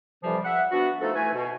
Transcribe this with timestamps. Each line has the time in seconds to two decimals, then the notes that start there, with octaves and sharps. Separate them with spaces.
0.24 F2 C3 E3 F3 G3
0.45 E5 F#5
0.72 B3 D4 F#4
1.01 F3 A3 D#4 A4
1.15 E3 A3 B4 G#5
1.34 B2